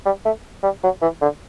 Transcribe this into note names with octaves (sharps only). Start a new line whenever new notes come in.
G3
A3
G3
F#3
E3
D3